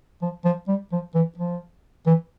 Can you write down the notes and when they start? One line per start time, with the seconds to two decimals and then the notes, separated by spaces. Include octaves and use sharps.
0.22 F3
0.45 F3
0.68 G3
0.92 F3
1.15 E3
1.37 F3
2.06 E3